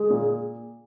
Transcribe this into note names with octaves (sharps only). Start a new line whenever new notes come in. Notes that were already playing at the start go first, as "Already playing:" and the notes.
Already playing: G#3 G#4
A#2